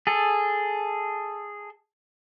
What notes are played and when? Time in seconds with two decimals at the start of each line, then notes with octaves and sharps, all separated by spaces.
0.07 G#4 A4